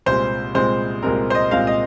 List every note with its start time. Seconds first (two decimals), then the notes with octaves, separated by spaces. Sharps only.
0.06 C2 A#2 G#3 C4 C5
0.55 C2 A#2 G#3 C4 C5
1.02 C2 A#2 G#3 C4 A#4
1.30 C5
1.35 D#5
1.51 C2 A#2 G#3 C4 F5
1.67 D#5